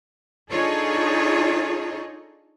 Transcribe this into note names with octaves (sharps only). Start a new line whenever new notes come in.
D4 D#4 F4 G#4 A4 C#5